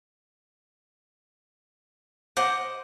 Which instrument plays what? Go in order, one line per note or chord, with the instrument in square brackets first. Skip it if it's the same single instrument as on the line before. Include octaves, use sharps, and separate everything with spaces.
[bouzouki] C5 D#5 F#5 [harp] D6